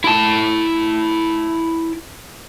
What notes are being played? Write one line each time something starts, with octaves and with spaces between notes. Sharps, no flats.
E4 A5